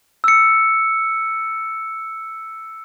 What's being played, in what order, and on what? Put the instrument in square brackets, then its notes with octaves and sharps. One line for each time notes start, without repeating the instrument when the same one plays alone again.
[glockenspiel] E6 C#7